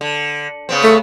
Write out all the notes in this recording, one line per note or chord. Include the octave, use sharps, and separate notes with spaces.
D3
C#3 B3 C4
A3